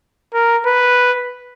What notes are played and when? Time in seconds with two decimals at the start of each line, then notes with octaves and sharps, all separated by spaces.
0.34 A#4
0.66 B4